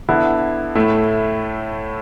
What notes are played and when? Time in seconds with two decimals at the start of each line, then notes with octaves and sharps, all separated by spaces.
0.08 D3 B3 E4
0.75 A2 A3 E4